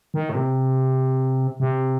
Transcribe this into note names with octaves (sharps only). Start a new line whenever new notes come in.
D#3
A2
C3
C3